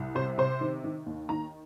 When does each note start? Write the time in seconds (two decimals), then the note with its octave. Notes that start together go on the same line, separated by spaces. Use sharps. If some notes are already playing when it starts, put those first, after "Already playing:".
Already playing: C2
0.15 C3 C5
0.38 C3 C5
0.61 D#3
0.84 D#3
1.06 D#2
1.29 D#3 A#5